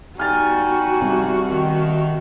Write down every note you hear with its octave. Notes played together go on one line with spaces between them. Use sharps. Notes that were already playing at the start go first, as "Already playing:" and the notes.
G3 D#4 F#4 G#5 F6 A6
C2
D#3